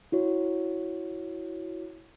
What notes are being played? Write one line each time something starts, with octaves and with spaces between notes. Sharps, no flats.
E4 F#4 C#5